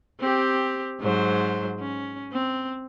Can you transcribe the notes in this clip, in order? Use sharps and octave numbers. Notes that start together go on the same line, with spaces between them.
C4 G4
G#2 F#3 C5
C#4
C4